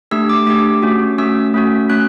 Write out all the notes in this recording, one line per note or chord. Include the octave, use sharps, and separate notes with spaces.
A3 D4 G4 E6
D6
A3 D4 G4 D6
A3 C#4 F#4
A3 C#4 F#4 E6
A3 C#4 F#4
A3 C#4 F#4 F#6